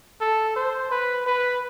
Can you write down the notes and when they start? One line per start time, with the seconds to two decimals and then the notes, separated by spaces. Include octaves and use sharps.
0.21 A4
0.56 C5
0.91 B4
1.26 B4